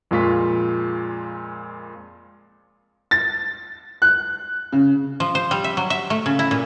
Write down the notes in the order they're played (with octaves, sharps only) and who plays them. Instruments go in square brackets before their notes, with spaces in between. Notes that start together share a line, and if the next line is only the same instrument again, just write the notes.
[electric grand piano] F2 A#2 G#3 F4 C#6 B6
[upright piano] A6
F#6
C#3
[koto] F3
C5
G3
E5
F#3
E5
A3
C#3
E4
A#2